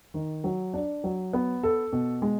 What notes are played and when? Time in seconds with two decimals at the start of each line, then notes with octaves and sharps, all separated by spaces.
0.14 D#3
0.44 F#3
0.74 D4
1.04 F#3
1.33 B3
1.63 A4
1.92 B2
2.22 G#3